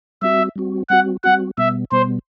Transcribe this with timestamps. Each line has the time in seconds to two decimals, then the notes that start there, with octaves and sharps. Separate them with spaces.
0.22 G3 C4 F#4 E5
0.56 G3 C4 F#4
0.90 G3 C4 F#4 F#5
1.24 G3 C4 F#4 F#5
1.58 B2 G3 B3 E5
1.92 B2 G3 B3 C5